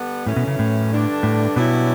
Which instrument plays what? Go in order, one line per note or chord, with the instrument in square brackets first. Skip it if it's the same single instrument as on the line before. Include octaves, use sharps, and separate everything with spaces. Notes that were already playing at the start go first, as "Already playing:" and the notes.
Already playing: [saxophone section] D3 G3 B3
[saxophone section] F#2 E3 A3 C#4 [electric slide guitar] A2
[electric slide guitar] B2
C#3
A2
[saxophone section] G2 D3 A3 D4
[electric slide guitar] A2
[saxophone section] G2 F#3 C#4 E4 [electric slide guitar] B2